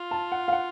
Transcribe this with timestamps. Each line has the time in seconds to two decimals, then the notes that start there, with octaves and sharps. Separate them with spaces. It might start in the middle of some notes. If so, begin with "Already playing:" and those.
Already playing: F4
0.11 A5
0.32 F#5
0.48 F5
0.52 F#5